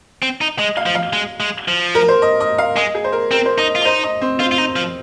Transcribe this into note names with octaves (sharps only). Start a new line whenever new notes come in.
C4
D#4
G#3 D#5
F5
F3
F5
G#3
G#3
F3
A#4
C5
D#5
D#5
F5
G#3 D#5
G#4
C5
A#4
C4 A#4
C5
D#4 D#5
F4
D#5
D#4 C5
D#5
C4
C4 F4
F4
D#4
F3